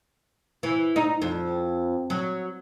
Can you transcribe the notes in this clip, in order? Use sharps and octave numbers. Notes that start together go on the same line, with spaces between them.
E3
D#4
F2
F#3